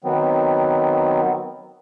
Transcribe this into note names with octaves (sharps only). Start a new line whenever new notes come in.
D#3 F#3 B3 C4